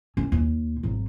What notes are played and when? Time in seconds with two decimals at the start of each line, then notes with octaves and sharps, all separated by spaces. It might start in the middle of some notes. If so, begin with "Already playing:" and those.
0.17 C#4
0.32 D#2
0.83 G#1 F#3